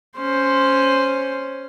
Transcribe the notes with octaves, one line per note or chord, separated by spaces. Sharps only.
C#4 C5